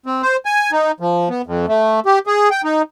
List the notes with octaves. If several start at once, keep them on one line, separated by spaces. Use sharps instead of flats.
C4
C5
G#5
D#4
F3
B3
F2
A3
G4
G#4
G5
D#4